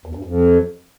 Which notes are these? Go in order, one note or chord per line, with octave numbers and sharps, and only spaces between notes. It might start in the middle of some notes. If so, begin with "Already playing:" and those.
E2
G2
F2